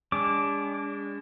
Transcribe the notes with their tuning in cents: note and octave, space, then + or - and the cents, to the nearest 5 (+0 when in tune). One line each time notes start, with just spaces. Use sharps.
G#3 -40 D4 -35 D6 +0